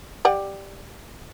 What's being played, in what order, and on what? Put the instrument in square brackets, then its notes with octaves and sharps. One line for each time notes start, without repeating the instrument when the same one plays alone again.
[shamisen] G4 D5 F#5